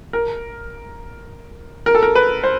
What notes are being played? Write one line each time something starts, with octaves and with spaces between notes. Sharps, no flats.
A#4
A#4
A4
A#4
B4
C5